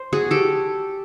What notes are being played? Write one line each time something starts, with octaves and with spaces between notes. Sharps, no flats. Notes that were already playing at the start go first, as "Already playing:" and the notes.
Already playing: C5
F#4 G#4
G4 A4